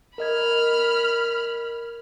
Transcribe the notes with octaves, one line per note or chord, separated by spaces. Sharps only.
A#4 D#5 B5 F6 G#6